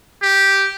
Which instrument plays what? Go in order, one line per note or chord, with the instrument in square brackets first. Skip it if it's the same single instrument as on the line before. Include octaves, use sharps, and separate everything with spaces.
[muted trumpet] G4